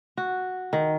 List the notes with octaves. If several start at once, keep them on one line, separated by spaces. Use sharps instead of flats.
F#4
D#3